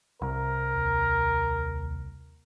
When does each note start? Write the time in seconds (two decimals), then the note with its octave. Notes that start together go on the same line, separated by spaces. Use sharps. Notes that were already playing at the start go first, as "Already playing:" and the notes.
0.22 C2 A#4
0.75 D#2